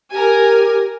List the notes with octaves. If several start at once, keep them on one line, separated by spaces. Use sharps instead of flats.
G4 A#4 G#5